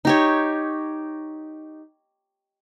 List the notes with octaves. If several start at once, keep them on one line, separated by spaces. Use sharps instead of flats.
D#4 G4 C#5